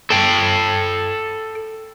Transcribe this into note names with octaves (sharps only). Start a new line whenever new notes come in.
A4 G5